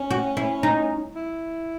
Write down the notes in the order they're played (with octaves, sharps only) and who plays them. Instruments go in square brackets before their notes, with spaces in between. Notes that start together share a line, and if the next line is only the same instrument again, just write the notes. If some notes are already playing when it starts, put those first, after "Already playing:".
Already playing: [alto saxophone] C#4
[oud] F#4
E4
D#4
[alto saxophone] E4